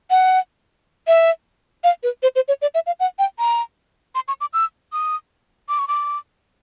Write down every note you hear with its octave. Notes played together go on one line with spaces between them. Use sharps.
F#5
E5
F5
B4
C5
C5
C#5
D5
E5
F5
F#5
G5
A#5
C6
C#6
D6
E6
D#6
D6
C#6
D6